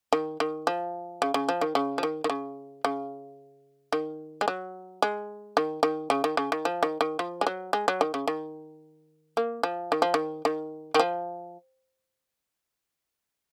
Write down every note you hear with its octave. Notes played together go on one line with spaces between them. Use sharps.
D#3
D#3
F3
C#3
C#3
F3
D#3
C#3
F3
D#3
D#3
C#3
C#3
D#3
G#3
F#3
G#3
D#3
D#3
C#3
D#3
C#3
D#3
F3
D#3
D#3
F3
G#3
F#3
G#3
F#3
D#3
C#3
D#3
A#3
F3
D#3
F3
D#3
D#3
D#3
F3